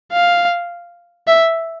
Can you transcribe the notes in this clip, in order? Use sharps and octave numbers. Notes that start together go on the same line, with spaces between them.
F5
E5